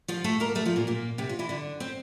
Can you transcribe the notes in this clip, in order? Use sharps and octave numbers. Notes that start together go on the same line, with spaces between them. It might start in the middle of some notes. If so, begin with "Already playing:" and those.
F3 F4
A3 A4
A#3 A#4
A3 A4
F3 F4
A#2 A#3
A#2 A#3
C3 C4
F4
E3 E4
D3 D4
C4 C5